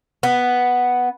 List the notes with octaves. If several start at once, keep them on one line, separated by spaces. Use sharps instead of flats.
B3